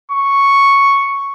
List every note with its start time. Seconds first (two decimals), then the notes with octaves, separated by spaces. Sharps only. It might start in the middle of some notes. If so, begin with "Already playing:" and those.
0.12 C#6